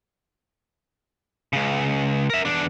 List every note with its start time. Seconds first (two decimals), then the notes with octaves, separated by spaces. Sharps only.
1.53 C#2 C#3
2.30 A#4 E5
2.45 E2 D4